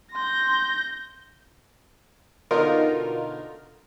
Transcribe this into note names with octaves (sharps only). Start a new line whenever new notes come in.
C6 G6 A#6
B2 D3 D#4 F4 A#4